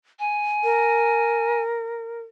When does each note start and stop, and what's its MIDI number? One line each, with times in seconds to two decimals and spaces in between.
0.19 1.62 80
0.64 2.21 70